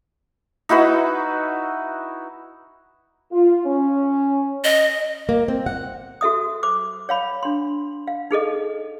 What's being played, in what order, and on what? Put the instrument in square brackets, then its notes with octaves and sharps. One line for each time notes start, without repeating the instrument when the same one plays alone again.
[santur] D#4 E4 F#4 B4
[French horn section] F4
C#4
[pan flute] D#5
[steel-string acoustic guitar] A#3
C4
F#5
[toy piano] F#4 A4 E5 D#6
C5 D6
C#5 F5 B5
D4 C6
F5
D#4 G#4 A4 D#5